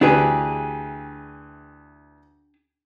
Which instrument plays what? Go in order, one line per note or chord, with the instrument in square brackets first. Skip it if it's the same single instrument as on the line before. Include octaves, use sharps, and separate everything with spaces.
[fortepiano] D2 E3 B4 [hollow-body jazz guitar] D4 G4 G#4